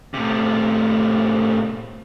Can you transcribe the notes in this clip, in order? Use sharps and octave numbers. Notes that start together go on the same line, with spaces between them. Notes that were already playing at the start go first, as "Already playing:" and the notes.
A2 C3